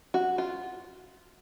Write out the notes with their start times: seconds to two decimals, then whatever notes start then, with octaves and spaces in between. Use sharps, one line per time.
0.14 F#4
0.38 F4